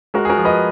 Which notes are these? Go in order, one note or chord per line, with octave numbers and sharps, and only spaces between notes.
G#3 F#4 A#4
G#4
F#4 A#4
F3
B4 D#5